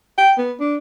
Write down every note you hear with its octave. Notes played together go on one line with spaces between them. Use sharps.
G5
B3
D4